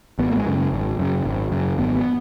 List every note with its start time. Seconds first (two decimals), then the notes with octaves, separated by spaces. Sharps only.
0.19 G#1 B3
0.30 A#3
0.37 G#3
0.46 F#2 C#3
0.72 G#1
0.99 F#2 C#3
1.25 G#1
1.52 F#2 C#3
1.78 G#1 B3
1.96 B3